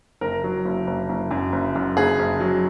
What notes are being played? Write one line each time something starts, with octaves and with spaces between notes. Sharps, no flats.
F#1 A#4
F#3
F#1
F#1
F#1
F#2
F#1
F#2
F#1 G#4
F#1
F#3